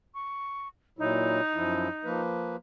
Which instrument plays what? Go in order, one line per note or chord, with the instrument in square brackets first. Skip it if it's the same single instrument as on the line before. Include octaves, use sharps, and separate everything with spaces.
[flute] C#6
[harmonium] A#2 F#3 E4 [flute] D#4
[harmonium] F#2 F3 E4
F3 A#3 B4